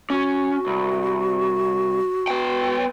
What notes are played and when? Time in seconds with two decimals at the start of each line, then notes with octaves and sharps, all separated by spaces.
0.10 C#4 F#4
0.67 C2
2.28 B3 G5